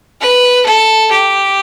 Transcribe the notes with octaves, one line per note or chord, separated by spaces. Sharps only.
B4
A4
G4